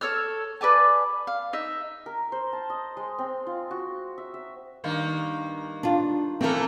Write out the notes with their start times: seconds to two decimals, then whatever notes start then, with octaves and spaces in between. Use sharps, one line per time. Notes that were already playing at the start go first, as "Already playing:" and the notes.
0.01 A4 C#5 E6 F6
0.61 B4 D5 G#5 A5
1.27 F5
1.53 D#4 E5
2.06 A#4
2.32 C5
2.53 A5
2.70 D#5
2.97 G#3
3.18 C4
3.47 F4
3.71 F#4
4.18 E5
4.34 E5
4.84 G2 D#3 A#3
5.83 D4 F4
6.41 E3 A3 A#3 C4 A#4